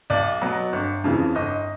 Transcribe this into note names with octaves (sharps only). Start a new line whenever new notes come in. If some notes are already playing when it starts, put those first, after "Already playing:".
B1 D5
B2 F#3
G1
F2 C#3 E3
G1 D#5